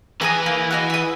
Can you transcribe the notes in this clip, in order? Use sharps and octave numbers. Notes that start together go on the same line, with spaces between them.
E3 G#4 B4 A#5 D#6
A#3
F#4 G#4 D#5
E5 D#6